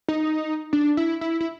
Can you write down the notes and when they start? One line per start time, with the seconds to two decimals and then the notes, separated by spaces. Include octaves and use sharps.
0.08 D#4
0.73 D4
0.97 E4
1.21 E4
1.41 E4